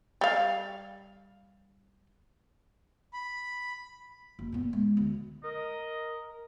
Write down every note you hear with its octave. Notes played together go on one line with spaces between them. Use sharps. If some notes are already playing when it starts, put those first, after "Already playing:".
G3 F5
B5
F#1
A#2 B3
G#3
D2
A#4 D#5